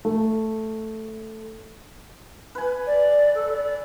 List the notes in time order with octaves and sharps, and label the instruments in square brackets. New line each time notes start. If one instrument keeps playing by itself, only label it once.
[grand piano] A3
[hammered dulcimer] B4 G#5
[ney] D5
A4
D5